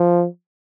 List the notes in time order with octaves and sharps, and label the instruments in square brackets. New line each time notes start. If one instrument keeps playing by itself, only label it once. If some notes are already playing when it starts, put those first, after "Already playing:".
Already playing: [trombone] F3